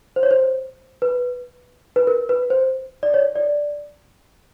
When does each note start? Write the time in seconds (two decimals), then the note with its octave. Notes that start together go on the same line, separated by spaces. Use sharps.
0.16 C5
0.23 C#5
0.31 C5
1.02 B4
1.96 B4
2.07 A#4
2.29 B4
2.50 C5
3.03 D5
3.14 C#5
3.36 D5